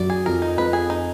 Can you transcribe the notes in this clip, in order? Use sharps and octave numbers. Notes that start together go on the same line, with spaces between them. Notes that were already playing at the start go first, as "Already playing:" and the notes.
Already playing: F#2 F#3 D5
G#4
F2 F3 A#4
D#4
F2 F3 B4
G#4
D#4